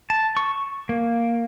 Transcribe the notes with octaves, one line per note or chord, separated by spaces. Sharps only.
A5
C#6
A#3